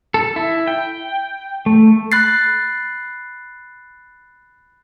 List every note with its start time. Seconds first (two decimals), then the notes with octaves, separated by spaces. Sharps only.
0.14 A4
0.36 E4
0.68 G5
1.66 A3
2.12 B5 F#6 A6 C7